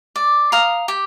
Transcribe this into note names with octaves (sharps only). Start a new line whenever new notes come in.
D5
F5 A#5 D#6
G4